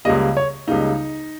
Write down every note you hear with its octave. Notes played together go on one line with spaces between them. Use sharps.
C#2 C#3 G3 A#3 D#5
C#5
C#2 C#3 G3 A#3 D#4